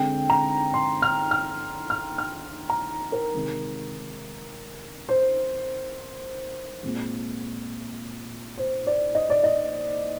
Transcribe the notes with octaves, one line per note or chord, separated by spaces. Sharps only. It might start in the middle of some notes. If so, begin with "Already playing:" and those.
Already playing: D3 G#3 C4 G5
A#5
C6
F6
F6
F6
F6
A#5
A#4
C3 D#3 G#3
C5
A#2 G#3 C4
C5
D5
D#5
D5
D#5